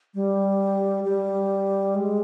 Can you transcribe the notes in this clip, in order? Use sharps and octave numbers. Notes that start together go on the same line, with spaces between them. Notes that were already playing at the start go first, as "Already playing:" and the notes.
G3
G3
G#3